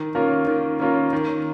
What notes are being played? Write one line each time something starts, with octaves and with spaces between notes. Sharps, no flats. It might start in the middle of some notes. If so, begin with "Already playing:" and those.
Already playing: D#3
A#3 C#4 F4 A#4
D#3
A#3 C#4 F4 A#4
D#3